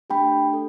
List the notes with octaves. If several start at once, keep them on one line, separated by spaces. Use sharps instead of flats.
A3 D4 G4 G5 B5
A4